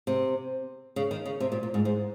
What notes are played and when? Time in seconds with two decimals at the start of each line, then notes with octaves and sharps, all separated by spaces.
0.07 C3
0.96 C#3
1.11 D#3
1.26 C#3
1.40 C3
1.52 A#2
1.63 A#2
1.74 G#2
1.85 G#2